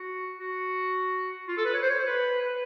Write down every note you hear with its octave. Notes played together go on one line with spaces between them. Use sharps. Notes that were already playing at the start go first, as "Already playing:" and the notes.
Already playing: F#4
F#4
F4
A4
B4
C#5
C5
C#5
C5
B4
B4